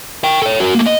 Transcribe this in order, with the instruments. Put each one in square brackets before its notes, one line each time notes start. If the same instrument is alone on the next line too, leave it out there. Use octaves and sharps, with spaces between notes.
[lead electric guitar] A#4 G5
A4 C#5
F#4 A#4
A3 A#3
D#5